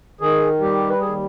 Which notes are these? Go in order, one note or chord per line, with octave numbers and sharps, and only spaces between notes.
D#3 G#4
G3 G4
B4
D#2 G#4